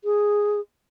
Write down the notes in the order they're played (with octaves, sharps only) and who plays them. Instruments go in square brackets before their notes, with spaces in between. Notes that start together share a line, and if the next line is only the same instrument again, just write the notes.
[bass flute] G#4